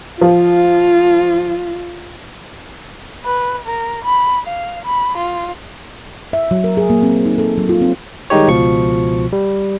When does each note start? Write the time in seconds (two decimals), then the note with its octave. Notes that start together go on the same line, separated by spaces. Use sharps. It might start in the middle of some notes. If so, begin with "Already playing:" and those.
0.21 F3 F4
3.25 B4
3.65 A#4
4.05 B5
4.47 F5
4.85 B5
5.18 F4
6.33 E5
6.51 F#3
6.64 A#4
6.77 G#4
6.90 A#3
7.03 C4
7.26 D#4
7.38 A4
7.58 F#3
7.69 F4
7.81 C4
8.30 D#3 G3 G#3 D#4 G4 C#5
8.48 C#2 B2 F3 C#6
9.33 G3